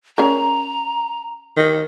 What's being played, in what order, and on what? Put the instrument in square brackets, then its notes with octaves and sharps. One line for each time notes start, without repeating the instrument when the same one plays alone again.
[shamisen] C#4 G#4 A#4 [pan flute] A#5
[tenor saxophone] D#3